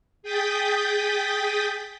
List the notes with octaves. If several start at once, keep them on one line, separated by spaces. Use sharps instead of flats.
G#4 G5 D#6 G6 A6 B6